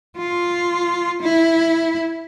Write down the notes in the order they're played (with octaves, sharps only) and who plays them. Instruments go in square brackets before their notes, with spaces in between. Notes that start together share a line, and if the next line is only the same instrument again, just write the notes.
[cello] F4
E4